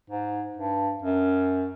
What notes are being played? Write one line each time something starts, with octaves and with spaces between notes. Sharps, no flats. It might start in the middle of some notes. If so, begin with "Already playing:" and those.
G#2
G2
F#2